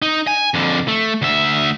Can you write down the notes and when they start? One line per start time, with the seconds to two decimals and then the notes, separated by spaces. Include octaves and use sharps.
0.02 D#4
0.27 G#5
0.54 F2 D3
0.88 A3
1.22 D2 E5